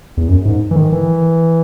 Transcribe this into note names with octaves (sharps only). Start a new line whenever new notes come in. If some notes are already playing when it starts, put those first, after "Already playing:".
E2
F#2
G#2
E3
D#3
E3